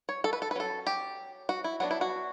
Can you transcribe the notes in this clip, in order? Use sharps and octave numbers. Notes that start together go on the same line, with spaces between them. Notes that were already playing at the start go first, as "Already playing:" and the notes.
C#5
A4
B4
A4
B4
F#3 C#4 A4
G4
F#4
E4
F#3 B3 D4 F#4
E4
F#4